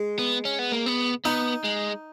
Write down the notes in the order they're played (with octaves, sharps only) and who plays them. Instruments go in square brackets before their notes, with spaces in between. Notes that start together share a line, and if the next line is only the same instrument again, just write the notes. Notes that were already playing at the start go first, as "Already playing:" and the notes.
Already playing: [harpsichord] G#3
[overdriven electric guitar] B3
C#4
B3
A#3
B3
[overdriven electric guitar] B3 [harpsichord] D#4
[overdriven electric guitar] G#3